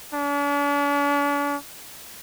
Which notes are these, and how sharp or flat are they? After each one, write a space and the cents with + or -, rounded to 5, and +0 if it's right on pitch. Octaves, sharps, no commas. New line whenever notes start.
D4 -45